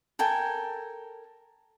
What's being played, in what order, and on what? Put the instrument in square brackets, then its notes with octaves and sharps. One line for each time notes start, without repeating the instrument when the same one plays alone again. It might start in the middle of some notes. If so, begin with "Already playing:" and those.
[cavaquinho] A4 A#4 G5 G#5